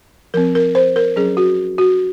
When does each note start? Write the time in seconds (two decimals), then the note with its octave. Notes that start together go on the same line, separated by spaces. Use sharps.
0.34 F3 C4 A#4
0.55 A#4
0.75 C5
0.96 A#4
1.16 F#3 C#4 G#4
1.37 F#4
1.78 F#4